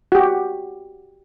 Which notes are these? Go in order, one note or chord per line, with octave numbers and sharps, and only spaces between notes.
F#4 G4